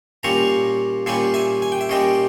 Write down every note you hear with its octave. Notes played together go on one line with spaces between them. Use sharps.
A#2 G3 C#4 A#5 C#6
A#2 G3 C#4 G#5 B5
E5 G#5
G#5
G5
E5
A#2 G3 C#4 D#5 G5